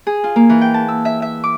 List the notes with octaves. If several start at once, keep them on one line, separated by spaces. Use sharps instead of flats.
G#4
F4
A#3
E3
G5
A5
E6
E5
E5
D6